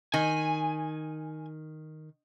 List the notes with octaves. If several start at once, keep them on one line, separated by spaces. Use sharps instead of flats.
D#3 G#5